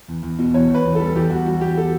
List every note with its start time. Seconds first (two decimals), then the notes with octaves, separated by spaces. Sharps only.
0.08 E2
0.23 E2
0.39 B2
0.54 E2 C#5
0.70 E2 B4
0.85 E2
0.95 G3 A4
1.15 E2 G4
1.30 E2 F#4
1.46 G3 F#4
1.61 E2 G4
1.77 A4